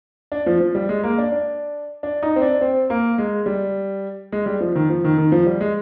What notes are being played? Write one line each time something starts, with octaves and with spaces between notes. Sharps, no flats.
D4
F3
F3
G3
G#3
A#3
D4
D4
D4
D#4
C4
D4
C4
A#3
G#3
G3
G#3
G3
F3
D#3
F3
D#3
D#3
F3
G3
G#3